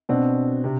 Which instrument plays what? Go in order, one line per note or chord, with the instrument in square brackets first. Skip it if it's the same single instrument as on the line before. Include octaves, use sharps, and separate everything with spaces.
[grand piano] B2 C4 D4
C3